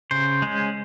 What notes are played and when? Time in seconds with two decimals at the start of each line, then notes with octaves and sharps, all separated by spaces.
0.11 C#3 C5
0.42 G#3 C#4